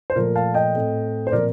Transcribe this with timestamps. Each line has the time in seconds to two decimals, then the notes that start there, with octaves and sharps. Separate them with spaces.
0.10 C5
0.15 A#2 F3 A3 A#4
0.36 F5 A5
0.54 D#5 G5
0.74 A2 A3 C4
1.27 C5
1.32 A#2 F3 C4 A#4 D5